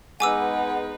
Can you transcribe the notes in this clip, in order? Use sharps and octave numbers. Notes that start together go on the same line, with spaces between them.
G#3 B3 D#4 B4 F#5 G#5 D6 E6